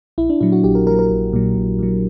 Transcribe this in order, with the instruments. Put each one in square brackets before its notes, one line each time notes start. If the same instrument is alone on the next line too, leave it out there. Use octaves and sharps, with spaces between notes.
[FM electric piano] A#1 E4
D4
A#2 F#3 E4
F#4
A#1 G4
A#4
A#2 A#4
F#3
A#4
A#1
A#2 F#3
A#1
A#2 F#3